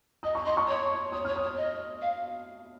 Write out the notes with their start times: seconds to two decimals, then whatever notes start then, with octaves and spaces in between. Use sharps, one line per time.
0.23 D#5 D#6
0.35 C#6
0.45 D#5 C6
0.57 C#6
0.68 C#5
1.12 C#5 D#6
1.25 C#5 F6
1.36 D#6
1.43 C#5
1.57 D#5
2.01 F5